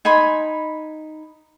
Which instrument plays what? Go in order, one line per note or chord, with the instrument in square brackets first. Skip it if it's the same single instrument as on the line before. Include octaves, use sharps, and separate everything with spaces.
[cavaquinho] D#4 G#5 B5 C6